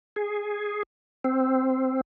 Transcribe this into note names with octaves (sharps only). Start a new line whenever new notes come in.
G#4
C4